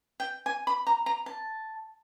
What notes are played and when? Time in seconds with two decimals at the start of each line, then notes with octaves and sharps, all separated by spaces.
0.20 G5
0.46 G#5
0.67 B5
0.87 A#5
1.06 A#5
1.26 A5